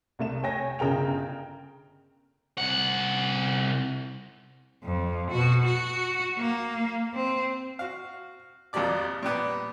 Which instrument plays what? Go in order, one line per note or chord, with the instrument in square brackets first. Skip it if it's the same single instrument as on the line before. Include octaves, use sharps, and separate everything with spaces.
[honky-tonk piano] C2 A3 E7
C#5 G5 G#5 A#6
G1 C#3 A#4 G5 F7
[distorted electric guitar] C2 F#5
[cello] F2
B2 F#4
F#4
A#3
C4
[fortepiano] F#4 F5
G#1 F2 A#3 G4 D5 D6
A#2 G3 B3